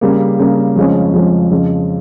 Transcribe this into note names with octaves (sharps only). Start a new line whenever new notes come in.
C#3 G3 A#3
C#3 G3 A#3
F2 C#3 F3 G#3 C#4
F2 C#3 F3 G#3 C#4
F2 C#3 F3